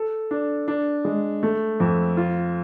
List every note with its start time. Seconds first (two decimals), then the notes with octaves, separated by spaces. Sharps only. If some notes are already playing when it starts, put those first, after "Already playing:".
Already playing: A4
0.31 D4
0.68 D4
1.05 G#3
1.43 A3
1.80 F2
2.17 F4